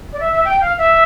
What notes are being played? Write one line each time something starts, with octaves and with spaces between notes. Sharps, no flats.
D5
E5
E5
G5
F5
E5